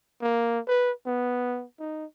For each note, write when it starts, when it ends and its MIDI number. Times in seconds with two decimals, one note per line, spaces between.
0.22 0.60 58
0.68 0.92 71
1.06 1.65 59
1.79 2.05 63